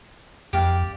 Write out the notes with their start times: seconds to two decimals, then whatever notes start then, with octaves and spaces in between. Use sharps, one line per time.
0.53 F2 G4 D5 F5